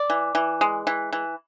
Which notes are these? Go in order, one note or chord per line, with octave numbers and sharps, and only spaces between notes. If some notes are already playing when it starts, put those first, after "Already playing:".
Already playing: D5
E3
E3
G#3
E3
E3